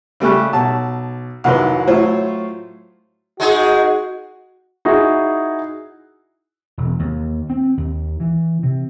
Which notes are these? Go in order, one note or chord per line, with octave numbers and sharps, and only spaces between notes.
C#3 G3 A3 C#6 F#6
B1 A5
C2 F2 D#3 F#3 B4 C6
A2 F#3 F4 C5 C#5
G#3 D#4 F#4 G#4
D#4 E4 F#4 G#4
E1
D#2
C4
D#2
E3
C3